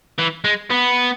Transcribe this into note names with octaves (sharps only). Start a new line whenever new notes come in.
E3
G#3
B3